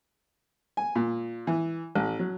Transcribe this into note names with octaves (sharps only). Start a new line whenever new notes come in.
G#5
A#2
E3
A1
F#3